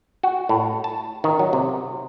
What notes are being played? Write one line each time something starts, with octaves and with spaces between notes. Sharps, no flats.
F#4
A2
A5
D#3
F#3
C3